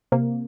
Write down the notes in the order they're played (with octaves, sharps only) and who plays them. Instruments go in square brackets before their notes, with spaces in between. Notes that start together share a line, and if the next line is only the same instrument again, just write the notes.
[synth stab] C3 A#3